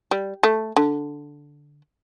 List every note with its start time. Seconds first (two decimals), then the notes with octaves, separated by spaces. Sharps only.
0.11 G3
0.43 A3
0.76 D3